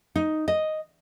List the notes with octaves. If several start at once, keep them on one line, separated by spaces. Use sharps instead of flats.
D#4
D#5